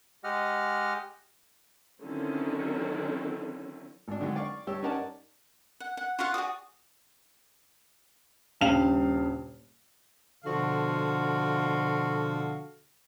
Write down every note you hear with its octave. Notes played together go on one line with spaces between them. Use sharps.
G#3 G4 D#5 F#5 F6
D3 D#3 F#3 C4 C#4 E4
G#1 D4
D3 D#3 F#3 G#3
D5 F5 C#6
G2 G4 C#5 E6
C#4 D#4 A#4 D5 F#5 A5
F#5
F#5
F4 F#4 F5 F#5
F#4 G#4 D5 D#6
D#1 G2 C#3 G4 F5 F7
B2 D3 F3 F#4 A4 F5